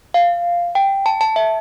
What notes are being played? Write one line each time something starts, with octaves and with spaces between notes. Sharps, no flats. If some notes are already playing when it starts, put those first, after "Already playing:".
F5
G5
A5
A5
E5